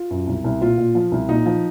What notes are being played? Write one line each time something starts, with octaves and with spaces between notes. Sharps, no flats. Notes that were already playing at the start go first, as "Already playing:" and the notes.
Already playing: F4
F#2
C2
C2
A#2 F4
A#2
F3
C2
A#2 D#4
F3